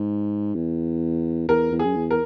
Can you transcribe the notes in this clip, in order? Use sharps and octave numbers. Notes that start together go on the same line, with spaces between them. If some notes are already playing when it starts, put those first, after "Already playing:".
Already playing: G#2
E2
E2 A#4
E2
G#4
F#2
E2
A#4